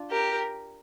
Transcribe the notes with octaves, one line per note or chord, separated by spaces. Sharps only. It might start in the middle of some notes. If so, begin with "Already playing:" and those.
Already playing: D4 F4
G4 A#4